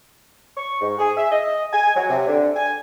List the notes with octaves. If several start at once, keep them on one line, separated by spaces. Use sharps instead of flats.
C#6
G#2
G#4
E5
D#5
G#5
F#3
C3
D3
G#5